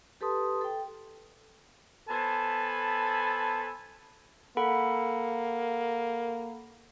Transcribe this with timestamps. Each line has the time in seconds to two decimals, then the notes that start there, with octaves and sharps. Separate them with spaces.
0.21 G4 A4 B4 A5 C6 D#6
0.61 A4 G5
2.09 B3 A4 C5 G#5 A5 B5
4.57 A#3 A4 F#5 B5